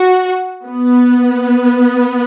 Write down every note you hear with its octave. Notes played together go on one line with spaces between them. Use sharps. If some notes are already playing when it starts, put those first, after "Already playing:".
Already playing: F#4
B3